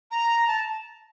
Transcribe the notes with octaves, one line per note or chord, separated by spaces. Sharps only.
A#5
A5